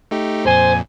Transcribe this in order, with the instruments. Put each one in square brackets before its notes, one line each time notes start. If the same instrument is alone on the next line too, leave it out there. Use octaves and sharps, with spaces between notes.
[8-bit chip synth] A3 D#4 G4
[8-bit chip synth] F2 A#2 [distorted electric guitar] C5 [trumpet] G#5